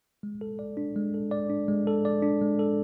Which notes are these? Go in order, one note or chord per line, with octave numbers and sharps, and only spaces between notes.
G#3
A4
D5
D4
G#3
A4
D5
D4
G#3
A4
D5
D4
G#3
A4